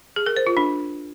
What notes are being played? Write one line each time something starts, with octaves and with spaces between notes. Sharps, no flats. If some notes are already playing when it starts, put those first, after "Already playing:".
G#4
A#4
C5
F4
D4